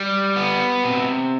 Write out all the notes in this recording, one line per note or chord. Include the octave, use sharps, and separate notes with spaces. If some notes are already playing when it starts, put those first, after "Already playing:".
Already playing: G3
B3
C3